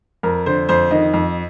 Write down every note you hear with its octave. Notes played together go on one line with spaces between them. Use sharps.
F2 A#4
D3 C5
F2 C5
D#3 D#5
F2